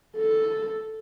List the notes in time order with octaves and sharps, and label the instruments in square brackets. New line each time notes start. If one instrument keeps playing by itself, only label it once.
[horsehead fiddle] A4